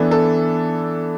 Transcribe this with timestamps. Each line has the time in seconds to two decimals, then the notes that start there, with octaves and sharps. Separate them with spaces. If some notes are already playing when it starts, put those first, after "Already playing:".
Already playing: E3 B3 D4 A4
0.11 A4